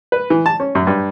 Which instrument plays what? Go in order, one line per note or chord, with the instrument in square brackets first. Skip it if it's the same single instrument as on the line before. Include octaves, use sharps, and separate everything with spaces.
[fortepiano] B4
E3
A5
C#4
F#2
G2